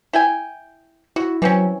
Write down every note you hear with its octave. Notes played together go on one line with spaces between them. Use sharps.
E4 G5 G#5
E4 F#4
E3 F#3 C4 C#4